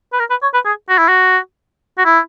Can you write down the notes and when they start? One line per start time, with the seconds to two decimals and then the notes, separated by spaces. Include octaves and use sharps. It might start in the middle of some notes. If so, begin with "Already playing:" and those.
0.13 B4
0.20 A#4
0.30 B4
0.43 C#5
0.54 B4
0.66 G#4
0.89 F#4
0.98 E4
1.08 F#4
1.98 F#4
2.05 E4